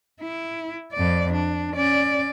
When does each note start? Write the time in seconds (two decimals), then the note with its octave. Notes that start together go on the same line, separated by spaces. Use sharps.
0.22 E4
0.93 F2 D5
1.33 D4
1.74 C#4 D5